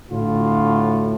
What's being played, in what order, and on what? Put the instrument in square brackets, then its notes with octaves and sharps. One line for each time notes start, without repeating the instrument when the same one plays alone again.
[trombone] A2 [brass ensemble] D3 F4 F#4